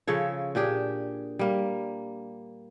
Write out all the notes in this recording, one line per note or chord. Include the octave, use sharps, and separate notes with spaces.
C#3 F3 A4 C#5
A#2 D4 G4 G#4
G3 A#3